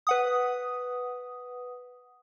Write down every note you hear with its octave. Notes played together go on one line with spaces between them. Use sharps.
B4 F#5 D#6